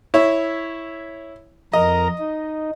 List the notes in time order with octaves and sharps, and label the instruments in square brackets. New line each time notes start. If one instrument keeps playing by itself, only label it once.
[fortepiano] E4 C#5 E5
[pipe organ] F2 A#4 A#5 [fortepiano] D#5
[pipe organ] D#4